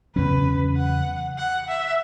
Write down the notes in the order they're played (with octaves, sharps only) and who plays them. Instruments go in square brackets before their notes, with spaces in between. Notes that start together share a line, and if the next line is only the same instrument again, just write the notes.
[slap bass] E2 C#3 F#3 C#4 [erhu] B4
[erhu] F#5
F#5
E5